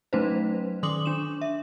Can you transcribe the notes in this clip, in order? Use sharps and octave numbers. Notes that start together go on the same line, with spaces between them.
F#3 A3 C#4 D#4 B4 C5
D#3 C6 D6 D#6 F#7
D4 E7
E5